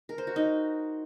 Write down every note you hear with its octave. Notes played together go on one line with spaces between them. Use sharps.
A#4
C5
F#4
D#4